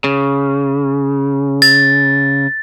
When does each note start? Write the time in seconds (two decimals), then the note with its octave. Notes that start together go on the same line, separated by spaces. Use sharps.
0.04 C#3
1.62 A6